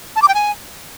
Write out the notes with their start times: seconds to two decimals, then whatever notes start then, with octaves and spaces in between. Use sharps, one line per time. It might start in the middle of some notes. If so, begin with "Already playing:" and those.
0.16 A5
0.22 D6
0.28 G5
0.35 G#5